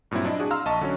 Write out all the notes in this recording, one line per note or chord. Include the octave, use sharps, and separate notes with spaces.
G2 A#2 F#3 C4 E4
D4 E4 D5 D#5
D4 F#4 G#4
F5 A#5 C6 E6 F6
A#1 D#5 A5 C#6
D3 F#3 C#4